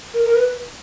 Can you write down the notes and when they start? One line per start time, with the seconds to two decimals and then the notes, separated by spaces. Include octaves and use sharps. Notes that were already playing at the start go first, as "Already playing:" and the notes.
0.14 A#4
0.25 A#4
0.35 B4